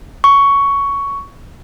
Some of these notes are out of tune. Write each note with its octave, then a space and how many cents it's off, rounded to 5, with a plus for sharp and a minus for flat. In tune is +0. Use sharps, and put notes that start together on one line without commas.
C#6 +10